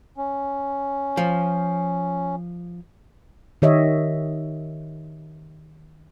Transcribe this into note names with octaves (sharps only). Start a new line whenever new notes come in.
C#4
F3
D#3 G4 C#5 D#5 E5